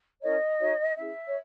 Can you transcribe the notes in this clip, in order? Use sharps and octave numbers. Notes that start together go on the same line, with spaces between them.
C#4 E4 A#4 C#5 D#5
D#4 F#4 C#5
C#4 E4 G#4 E5
C#5